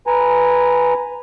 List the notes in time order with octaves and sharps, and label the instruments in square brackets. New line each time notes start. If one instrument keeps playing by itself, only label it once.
[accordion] B4 G#5 A#5